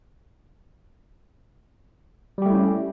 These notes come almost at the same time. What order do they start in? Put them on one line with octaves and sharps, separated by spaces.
G3 G4 A3 E4 C#4